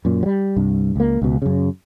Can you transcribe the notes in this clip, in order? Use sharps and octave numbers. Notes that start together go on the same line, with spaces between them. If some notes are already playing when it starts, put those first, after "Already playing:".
F#2 A#2
F#3 G3
C2 G2
C#2 A#3
C#2 B2
F#2 C#3